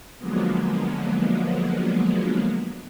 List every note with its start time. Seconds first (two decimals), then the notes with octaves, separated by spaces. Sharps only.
0.18 D3 F3 F#3 G#3 A#3 B3